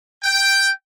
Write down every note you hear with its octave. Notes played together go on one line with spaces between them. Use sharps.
G5